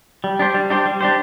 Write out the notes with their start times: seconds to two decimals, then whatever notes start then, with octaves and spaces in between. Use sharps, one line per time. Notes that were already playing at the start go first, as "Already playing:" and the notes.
0.24 G3
0.39 D4 G4 C5
0.54 G3
0.70 D4 G4 C5
0.86 G3
1.01 D4 G4 C5